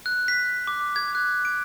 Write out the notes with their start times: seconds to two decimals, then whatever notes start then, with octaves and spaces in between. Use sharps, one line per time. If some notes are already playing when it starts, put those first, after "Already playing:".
0.06 F#6
0.28 B6
0.67 D6
0.96 G#6
1.15 F#6
1.45 D7